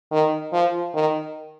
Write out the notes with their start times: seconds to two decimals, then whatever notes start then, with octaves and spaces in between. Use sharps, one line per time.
0.11 D#3
0.52 F3
0.94 D#3